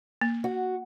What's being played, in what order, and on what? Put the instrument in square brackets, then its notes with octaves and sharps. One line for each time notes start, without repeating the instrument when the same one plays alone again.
[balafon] A#3
[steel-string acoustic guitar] F#4